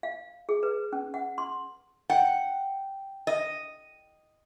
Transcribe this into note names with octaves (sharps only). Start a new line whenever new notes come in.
F5
G#4
B4
C#4
F#5
C6
F#5 G5
D#5